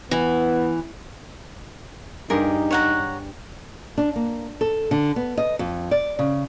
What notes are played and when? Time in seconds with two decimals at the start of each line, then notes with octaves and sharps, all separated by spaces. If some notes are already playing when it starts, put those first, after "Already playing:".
0.11 E3 B3
2.30 G2 D#4 G4 G#4 A#4
2.71 C#5 F#5 A#5
3.98 D4
4.16 A#3
4.61 A4
4.91 D3
5.16 B3
5.37 D#5
5.59 F2
5.91 D5
6.19 C#3